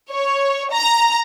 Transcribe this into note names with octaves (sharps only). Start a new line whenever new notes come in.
C#5
A#5